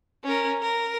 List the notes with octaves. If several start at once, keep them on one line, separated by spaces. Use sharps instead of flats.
C#4 A#4
A#4